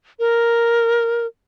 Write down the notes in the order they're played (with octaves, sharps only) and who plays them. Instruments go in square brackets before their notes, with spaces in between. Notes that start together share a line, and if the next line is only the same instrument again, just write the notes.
[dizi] A#4